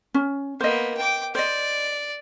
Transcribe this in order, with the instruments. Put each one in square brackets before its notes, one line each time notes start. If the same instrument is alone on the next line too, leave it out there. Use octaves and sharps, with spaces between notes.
[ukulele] C#4
[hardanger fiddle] A#3 B3 [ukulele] C5 D#5
[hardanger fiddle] G5 D6
[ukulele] C5 D#5 [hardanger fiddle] D5